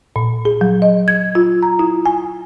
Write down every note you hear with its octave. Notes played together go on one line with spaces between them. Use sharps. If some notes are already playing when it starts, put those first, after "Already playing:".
A#2
G#4
F#3
D#5
G#6
F4
A#5
E4
G#5